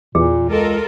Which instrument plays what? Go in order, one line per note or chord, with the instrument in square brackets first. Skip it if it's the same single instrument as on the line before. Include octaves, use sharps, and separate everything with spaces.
[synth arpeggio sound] E2 [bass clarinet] A#2 [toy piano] G#4
[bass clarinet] C#2 [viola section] F4 A4 A#4